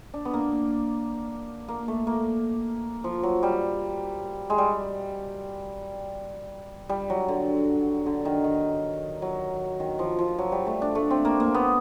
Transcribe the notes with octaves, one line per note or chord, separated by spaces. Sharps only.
D4
B3
A#3
A#3
A3
A#3
F3
F#3
G3
G#3
G3
G3
F#3
D3
D3
D#3
D#3
F#3
D#3
F3
F3
F#3
G3
A3
D4
A3
C4
A#3
A#3
B3